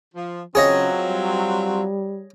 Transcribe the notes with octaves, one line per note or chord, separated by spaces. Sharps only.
F3
C#3 F#3 C4 F4 G#4 C#5 D#5
G3